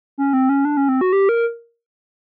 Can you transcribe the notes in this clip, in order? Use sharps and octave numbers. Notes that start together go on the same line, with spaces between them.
C#4
C4
C#4
D4
C#4
C4
F#4
G4
A#4